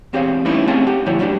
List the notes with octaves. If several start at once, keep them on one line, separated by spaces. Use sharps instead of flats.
E2 C4 G4 G#4 C#5 F5
G3 A3 B3 C#4 D#4 E4
A3 C4 C#4 G#4 F5 A5
G4 F#5
D2 A#2 F3 G3 E4 C#5
F#3 G3 A3 D4 G4